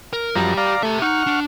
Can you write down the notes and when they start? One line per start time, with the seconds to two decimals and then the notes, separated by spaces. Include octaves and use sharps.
0.13 A#4
0.36 F#2 F3 G3 G4 A#5
0.57 D5 F5 A#5
0.83 A3 G4 E5
1.02 D#4 F#5 C#6 F6
1.27 D4